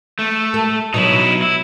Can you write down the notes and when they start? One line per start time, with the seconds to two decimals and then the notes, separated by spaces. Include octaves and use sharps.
0.19 A3
0.54 A4
0.94 B2 F#3 D#4 E4
1.42 E4